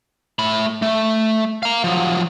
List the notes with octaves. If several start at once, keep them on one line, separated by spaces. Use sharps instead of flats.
A3 B5
A3
F5 A#5
F3 F#3